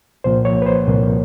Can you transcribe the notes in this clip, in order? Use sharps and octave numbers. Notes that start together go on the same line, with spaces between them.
C2 A#2 F3 A#3 C5
C#5
B4
C5
C2 A#2 F3 A#3